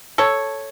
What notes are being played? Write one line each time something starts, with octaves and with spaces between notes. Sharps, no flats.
A4 C#5